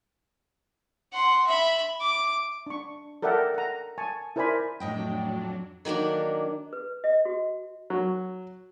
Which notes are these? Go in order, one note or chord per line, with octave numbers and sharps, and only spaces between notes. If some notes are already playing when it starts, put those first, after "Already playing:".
F#5 C6
E5 B5
D6
D4 C#6
A4 A#4 D5 E5 F#5 G5
F#5 A#5
G#5 A5 C#6
E4 A#4 C5 D5 G#5 B5
F2 A2 F#3 D4 D#5 G5
D#3 F#3 A#3 D4
B4
D#5
F#4
F#3